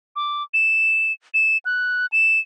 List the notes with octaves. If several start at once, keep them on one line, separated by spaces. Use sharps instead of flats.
D6
E7
E7
F#6
E7